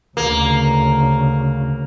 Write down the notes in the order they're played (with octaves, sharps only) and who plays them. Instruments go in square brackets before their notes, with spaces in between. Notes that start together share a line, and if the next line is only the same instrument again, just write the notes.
[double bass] D2 C#3 [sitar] A#3